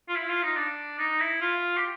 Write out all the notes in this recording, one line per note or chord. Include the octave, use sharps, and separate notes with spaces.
F4
E4
F4
D#4
D4
D#4
E4
F4
G4